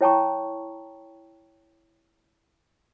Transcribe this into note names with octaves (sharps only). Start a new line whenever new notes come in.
E4 C#5 G5 A5 A#5 C#6